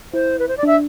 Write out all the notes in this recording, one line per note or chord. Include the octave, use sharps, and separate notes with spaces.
E4 C5
B4
C5
D5
D4 E5